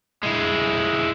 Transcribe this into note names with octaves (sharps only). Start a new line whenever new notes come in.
G#3 E4